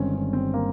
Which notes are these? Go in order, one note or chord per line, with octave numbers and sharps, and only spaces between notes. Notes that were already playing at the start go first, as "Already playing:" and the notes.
Already playing: G1 G2 D#3 G#3 C4 C#4
C#4
C4
A#3